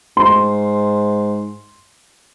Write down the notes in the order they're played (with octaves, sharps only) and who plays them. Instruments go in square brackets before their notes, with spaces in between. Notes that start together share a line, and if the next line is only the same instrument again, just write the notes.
[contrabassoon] G#2 [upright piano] C6